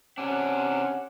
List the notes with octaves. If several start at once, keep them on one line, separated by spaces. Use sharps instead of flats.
C3 C#4 D4 F#5